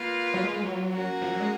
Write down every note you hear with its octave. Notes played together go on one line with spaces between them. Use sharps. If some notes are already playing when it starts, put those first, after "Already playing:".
Already playing: A#3 F4 B4
F#3
G#3
G#3
F#3
A#3 C#4 F#4 A#4
F3
F#3
G#3